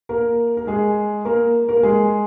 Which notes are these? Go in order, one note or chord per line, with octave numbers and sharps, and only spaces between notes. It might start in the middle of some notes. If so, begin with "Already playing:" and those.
A#3 A#4
A#4
G#3 G#4
A#3 A#4
A#3 A#4
G#3 G#4